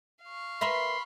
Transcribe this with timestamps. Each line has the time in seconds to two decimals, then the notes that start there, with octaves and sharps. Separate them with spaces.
0.24 F5 C#6
0.61 A#4 B4 E5 B5 C6